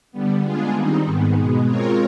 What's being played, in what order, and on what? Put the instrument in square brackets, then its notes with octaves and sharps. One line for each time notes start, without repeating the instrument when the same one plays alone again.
[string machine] D3 G3 B3
G#3 B3 D4 F4 G#4
D#3 G3 C4 D#4
G#2 D#3 G#3 B3
B2 G#3 B3
G#3 C4 F4 A#4 C#5